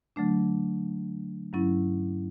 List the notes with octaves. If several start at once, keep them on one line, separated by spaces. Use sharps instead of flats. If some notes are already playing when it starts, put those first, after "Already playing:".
D3 F#3 A3 D4
G2 F#3 C#4 E4